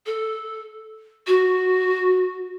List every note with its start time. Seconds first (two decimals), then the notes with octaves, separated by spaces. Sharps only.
0.06 A4
1.27 F#4